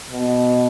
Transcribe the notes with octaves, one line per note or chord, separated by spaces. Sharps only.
B2